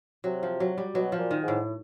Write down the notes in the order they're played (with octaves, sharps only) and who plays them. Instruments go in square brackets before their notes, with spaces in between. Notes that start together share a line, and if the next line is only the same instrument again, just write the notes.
[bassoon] C3 [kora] F#3
[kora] F3
F#3
G3
[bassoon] B2 [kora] F#3
[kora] F3
[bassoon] A#2
[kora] D#3
[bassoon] G#2
[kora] A2